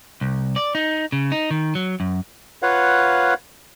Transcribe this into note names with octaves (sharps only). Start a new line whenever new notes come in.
C2
D5
D#4
C#3
D#4
D#3
F#3
F#2
F4 B4 C#5 F5 F#5